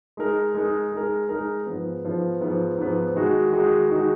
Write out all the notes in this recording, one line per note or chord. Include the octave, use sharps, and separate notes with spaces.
G#3 D#4 A#4
G#3 D#4 A#4
G#3 D#4 A#4
G#3 D#4 A#4
G#2 F3 B3
G#2 F3 B3
G#2 F3 B3
G#2 F3 B3
D#3 G#3 D#4 F#4
D#3 G#3 D#4 F#4
D#3 G#3 D#4 F#4